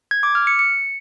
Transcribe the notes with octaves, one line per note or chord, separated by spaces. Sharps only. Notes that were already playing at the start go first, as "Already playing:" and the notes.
G#6
D6
F6
C#7
C#7